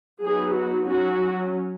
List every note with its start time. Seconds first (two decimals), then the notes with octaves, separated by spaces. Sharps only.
0.23 F#3 B3 D#4 G#4
0.56 F#4
0.88 F#3 C#4 F#4